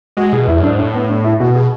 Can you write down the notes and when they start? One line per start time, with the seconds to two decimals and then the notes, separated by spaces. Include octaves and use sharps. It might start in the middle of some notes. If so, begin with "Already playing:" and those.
0.17 G#3 F#4
0.33 B2 G#4
0.48 E2 E4
0.58 F#2
0.63 D4
0.68 G#2
0.78 A2 D4
0.94 B3
1.09 D4
1.24 E4
1.40 B2 F#4
1.55 G#4